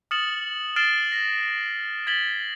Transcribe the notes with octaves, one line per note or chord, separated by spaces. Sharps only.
D#6 F6 A6 C#7 E7 F#7
F6 A6 C7 D7 E7 G7
A6 A#6
G#6 A6 B6 F#7 G7